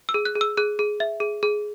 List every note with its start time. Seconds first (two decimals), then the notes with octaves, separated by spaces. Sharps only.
0.09 E6
0.14 G#4
0.25 F#6
0.35 G#4
0.41 E6
0.57 G#4 F#6
0.79 G#4
1.00 E5
1.20 G#4
1.43 G#4